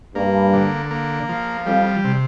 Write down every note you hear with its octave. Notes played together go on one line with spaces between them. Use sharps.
G2 A#3
D3
A#3
F3
F2 G3
C3